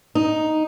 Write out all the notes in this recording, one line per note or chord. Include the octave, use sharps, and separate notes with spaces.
D#4